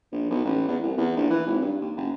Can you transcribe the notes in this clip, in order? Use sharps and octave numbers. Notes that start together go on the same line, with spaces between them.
A#1
B1
A1
E2
C2
E2
A#1
E3
G#1
G2
D#2
F#1